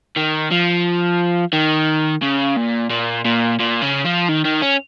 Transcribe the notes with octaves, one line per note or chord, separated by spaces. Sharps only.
D#3
F3
D#3
C#3
A#2
A#2
A#2
A#2
C#3
F3
D#3
D#3
C#4